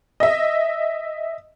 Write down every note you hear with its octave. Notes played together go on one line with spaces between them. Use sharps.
D#5 E5